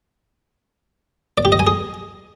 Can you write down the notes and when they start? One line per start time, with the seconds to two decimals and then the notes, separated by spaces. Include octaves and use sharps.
1.38 D5
1.45 G4
1.52 D#5
1.59 G#5
1.67 G#4